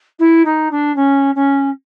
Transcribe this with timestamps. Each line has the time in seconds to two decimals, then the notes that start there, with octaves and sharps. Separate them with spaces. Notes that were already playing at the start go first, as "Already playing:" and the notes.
0.19 E4
0.45 D#4
0.71 D4
0.96 C#4
1.35 C#4